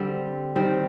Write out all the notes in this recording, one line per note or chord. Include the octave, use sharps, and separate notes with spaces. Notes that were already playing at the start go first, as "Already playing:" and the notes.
Already playing: D3 G3 C4
D#3 G3 C4